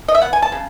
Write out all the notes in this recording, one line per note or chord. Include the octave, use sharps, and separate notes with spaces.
D#5
E5
B3 F#5
G#5
A5
C#3